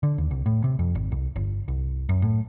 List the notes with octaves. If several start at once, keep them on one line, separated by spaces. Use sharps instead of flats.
D3
D#2
C2
A2
C3
F2
G#1
C2
G1
C2
F#2
A2